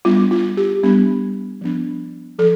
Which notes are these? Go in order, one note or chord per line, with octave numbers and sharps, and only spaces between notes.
G3 B3 D4 F4
F4
G4
G3 B3 D4
F3 B3 D4
F3 A4